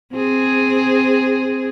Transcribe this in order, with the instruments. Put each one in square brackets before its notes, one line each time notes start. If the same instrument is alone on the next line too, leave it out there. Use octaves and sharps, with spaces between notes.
[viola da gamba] C4 G#4